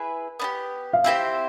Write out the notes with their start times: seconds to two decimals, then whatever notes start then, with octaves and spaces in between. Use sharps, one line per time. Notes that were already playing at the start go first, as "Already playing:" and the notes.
Already playing: E4 G#4 B4
0.40 B3 D4 G4
0.93 F5
1.04 C4 E4 G4 C5 E5